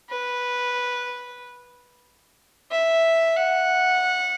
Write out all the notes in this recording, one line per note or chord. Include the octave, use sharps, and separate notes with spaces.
B4
E5
F#5